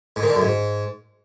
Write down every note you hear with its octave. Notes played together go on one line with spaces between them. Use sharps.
G#2
D#3
D3
F#2
G#2